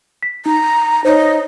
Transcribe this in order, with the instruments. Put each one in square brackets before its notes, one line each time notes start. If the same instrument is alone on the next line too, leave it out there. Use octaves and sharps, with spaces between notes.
[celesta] B6
[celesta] D#4 [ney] A#5
[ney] D#4 [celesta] C5 C#5